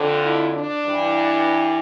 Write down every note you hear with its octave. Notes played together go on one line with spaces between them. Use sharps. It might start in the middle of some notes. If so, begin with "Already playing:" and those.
Already playing: F2 D3
E4
D4
G2 E3